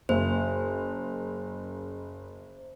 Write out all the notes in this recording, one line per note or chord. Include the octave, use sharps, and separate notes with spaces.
F#1 C5